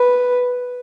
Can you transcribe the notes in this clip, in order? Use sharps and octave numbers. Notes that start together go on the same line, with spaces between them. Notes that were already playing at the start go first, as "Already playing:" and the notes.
Already playing: B4